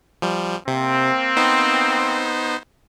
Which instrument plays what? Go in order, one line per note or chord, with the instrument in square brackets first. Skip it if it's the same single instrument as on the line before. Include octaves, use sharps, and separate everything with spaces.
[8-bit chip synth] F3 G3
[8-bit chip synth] C3 [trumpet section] A#3 C4
[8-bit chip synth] B3 D#4 C5